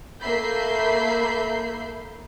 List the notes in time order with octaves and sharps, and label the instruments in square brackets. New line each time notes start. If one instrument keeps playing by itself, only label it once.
[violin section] A3 A#3 E5 B5 G6 C7